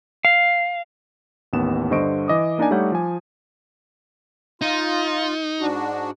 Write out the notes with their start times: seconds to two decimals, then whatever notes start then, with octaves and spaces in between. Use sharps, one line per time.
0.25 F5
1.53 A1 D#2 B3 E7
1.91 G2 D3 C5 D#5 C#6 D7
2.28 E3 D#5 D6 D#6
2.58 A#3 D4 D#4 D5 G#5
2.71 G3 A3 D#4 C#5 F#5 G6
2.92 F3 G#5
4.62 D#4 F4
5.61 G#2 D4 F#4